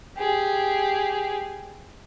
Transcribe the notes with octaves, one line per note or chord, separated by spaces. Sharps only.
G4 G#4